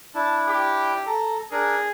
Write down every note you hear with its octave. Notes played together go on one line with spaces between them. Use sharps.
D4 E4 A5
G4
A4 A#5
D4 G#4 A#4